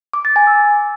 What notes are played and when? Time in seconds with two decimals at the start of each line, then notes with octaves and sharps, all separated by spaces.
0.13 D6
0.25 A6
0.36 G#5
0.47 E6